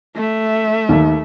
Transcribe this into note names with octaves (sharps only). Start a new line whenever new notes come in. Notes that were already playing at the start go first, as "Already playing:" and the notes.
A3 E5
D#2